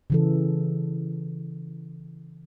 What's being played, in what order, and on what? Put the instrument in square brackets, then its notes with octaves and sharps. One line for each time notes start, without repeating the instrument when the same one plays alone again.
[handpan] C#3 E3 A4